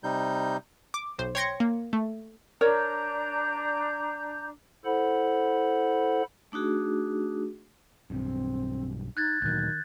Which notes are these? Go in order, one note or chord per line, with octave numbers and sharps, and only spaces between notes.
C3 G3 D#4 G6
D6
B1 C5
C#5 G5 C6 G#6 A#6 C#7
A#3
A3
D4 A#4 C#5 D5 A#5 G6
E4 A4 C5 F#5 B5
A3 D4 D#4 F#4 G#4
B1 G2 C4
D#4 F#6 G#6 A6
D2 A#2 D#3 F#3 F#6 G6